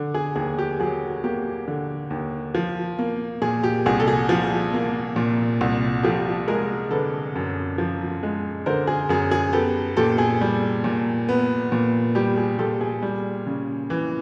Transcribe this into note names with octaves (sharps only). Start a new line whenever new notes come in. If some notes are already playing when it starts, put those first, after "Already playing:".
Already playing: D3
G#4
D#2 G#4
G4
F#3 G#4
A#3 G4
D3
D#2
F3
A#3
A#2 G#4
G4
C2 G#4
A4
G#4
F3
A#3
A#2
C2
F3 G4 A4
G#3 G#4 A#4
D3 A4 B4
F#2
F3
G#3
D3 A#4 C5
G#4
F#2 G#4
G#4
B3 G4 A4
A#2 G4 A4
G#4
G3
A#2
B3
A#2
G3 G4
G#4
A#2 G4 A4
G#4
G3
C#3
E3